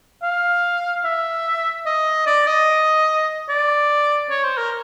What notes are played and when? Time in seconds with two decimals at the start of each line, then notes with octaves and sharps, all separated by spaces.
0.23 F5
1.04 E5
1.86 D#5
2.27 D5
2.47 D#5
3.49 D5
4.30 C#5
4.44 C5
4.58 A#4